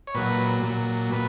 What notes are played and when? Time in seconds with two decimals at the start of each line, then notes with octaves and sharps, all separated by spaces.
0.07 C#5
0.15 A#2 F#3 B4
0.63 A#2 F#3
1.12 A#2 B4